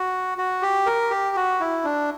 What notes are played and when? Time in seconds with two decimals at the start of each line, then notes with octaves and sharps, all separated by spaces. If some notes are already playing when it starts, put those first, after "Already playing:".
Already playing: F#4
0.38 F#4
0.62 G4
0.86 A#4
1.11 G4
1.36 F#4
1.60 E4
1.84 D4